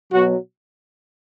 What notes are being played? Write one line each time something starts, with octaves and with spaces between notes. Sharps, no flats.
B2 F#3 F#4